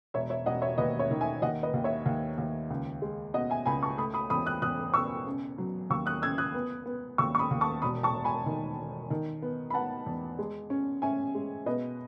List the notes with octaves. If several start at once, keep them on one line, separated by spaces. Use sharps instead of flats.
E1 C#5 E5
C#5 E5
E1 D#5 F#5
C#5 E5
D#2 B4 D#5
C#5 E5
D#3
E5 G#5
D#2 D#5 F#5
B4 D#5
D#2
C#5 E5
D#2
D#2
C#2
G#3
B2 D#5 F#5
E5 G#5
C#2 G#5 B5
A5 C#6
A3 B5 D#6
B5 D#6
E2 B5 D#6
D#6 F#6
E2 D#6 F#6
B2 C#6 E6
C#3
F#3
D#2 C#6 E6
D#6 F#6
C#3 E6 G#6
D#6 F#6
B3
B3
D#2 C#6 E6
C#6
B5 D#6
D#2
A5 C#6
E1 B5 D#6
A5 C#6
E1
G#5 B5
D#3
E1
D#3
B3
B5
B3 F#5 A5
E2
G#3
C#4
C#4 E5 G#5
G#3
B2 B4 D#5